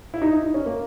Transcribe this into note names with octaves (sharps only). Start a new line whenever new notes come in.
E4
D#4
E4
D#4
C#4
A#3